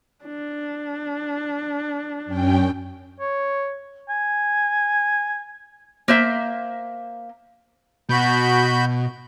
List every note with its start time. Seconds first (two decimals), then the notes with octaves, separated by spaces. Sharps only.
0.24 D4
2.26 F#2 C#4 G5
3.20 C#5
4.09 G#5
6.08 A#3 C5 E5
8.09 B2 F#4 B5 G6